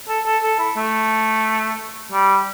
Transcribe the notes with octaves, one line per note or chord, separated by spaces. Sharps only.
A4
A4
A4
E4
A3
G3